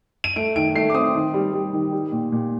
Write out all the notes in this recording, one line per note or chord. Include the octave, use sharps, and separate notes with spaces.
D#7
A3 D7
D#3 D7
A3 C7
D6
C4 D#6
D#3
G3
G3
D#3
G3
A#2
A#2